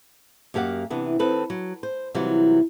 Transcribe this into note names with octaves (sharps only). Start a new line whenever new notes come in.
F#2 A#3 G4 F5 F#5
C3 E3 B3 D4
D#3 C4 A4 B4
F#3
C5
C3 E3 F#3 G3 D#4 F4